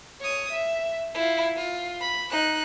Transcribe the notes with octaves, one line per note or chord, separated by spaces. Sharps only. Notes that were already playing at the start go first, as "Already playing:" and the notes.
C#5 D#6
E5
E4 F4
F4
B5
D#4 F#6